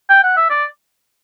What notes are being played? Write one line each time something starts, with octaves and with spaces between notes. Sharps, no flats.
G5
F#5
E5
D5